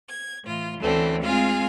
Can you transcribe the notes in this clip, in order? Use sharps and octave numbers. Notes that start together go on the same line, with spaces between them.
G#6
A2 E3 F4
D2 D3 E3 A3 C4 C#4
G#3 C4 F4 G#4 F5